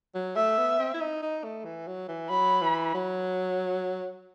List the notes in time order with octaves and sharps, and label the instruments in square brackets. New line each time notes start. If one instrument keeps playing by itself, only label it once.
[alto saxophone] F#3
[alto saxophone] A3 [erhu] E5
[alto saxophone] B3
C4
E4
D#4
D#4
A3
E3
F#3
E3
[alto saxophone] F#3 [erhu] B5
[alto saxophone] E3
F#3